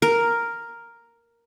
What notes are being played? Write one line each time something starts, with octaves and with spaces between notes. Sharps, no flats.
A#4